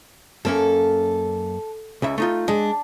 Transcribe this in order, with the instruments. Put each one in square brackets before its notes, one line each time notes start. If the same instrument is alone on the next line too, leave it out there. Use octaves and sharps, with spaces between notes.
[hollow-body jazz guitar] F#2 A#3 C#4 [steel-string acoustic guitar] A4
[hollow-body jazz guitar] C#2 C#3 E5
A3 D#4 F4
[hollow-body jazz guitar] G#3 [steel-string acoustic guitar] D4